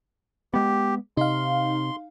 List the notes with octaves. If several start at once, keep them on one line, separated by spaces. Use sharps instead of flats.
G#3 B3 G4
C3 D#4 F5 C6